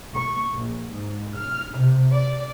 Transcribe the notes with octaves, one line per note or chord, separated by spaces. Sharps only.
C#6
A#1
G#2
F6
C3
D5